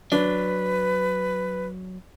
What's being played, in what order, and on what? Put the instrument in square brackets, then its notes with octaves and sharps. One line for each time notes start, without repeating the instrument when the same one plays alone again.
[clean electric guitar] F#3 [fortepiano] D4 [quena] B4